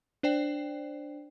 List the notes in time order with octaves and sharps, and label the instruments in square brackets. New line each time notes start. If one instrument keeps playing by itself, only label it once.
[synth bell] D4 C5 D5 G5 C7